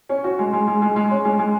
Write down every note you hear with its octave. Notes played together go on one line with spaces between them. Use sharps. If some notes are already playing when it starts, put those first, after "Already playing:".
C#4
F#4
G#3
G#3
G#3
G#3
G#3
C#4
G#3
G#3